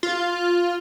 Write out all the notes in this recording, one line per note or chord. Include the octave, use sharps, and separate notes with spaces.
F4